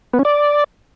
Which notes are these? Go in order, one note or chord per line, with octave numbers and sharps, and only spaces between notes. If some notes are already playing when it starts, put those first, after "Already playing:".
B3
C#4
D5